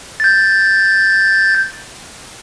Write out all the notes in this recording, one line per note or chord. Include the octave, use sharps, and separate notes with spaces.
G6 A6